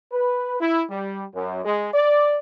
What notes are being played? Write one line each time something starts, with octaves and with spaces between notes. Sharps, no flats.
B4
E4
G3
F#2
G#3
D5